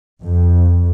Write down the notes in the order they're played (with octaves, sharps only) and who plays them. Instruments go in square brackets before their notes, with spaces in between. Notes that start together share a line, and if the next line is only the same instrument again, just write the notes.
[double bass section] F2